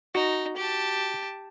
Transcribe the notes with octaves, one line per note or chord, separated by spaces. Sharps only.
D#4 F#4
G4 A5